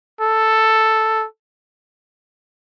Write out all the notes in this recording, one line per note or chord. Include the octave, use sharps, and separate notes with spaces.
A4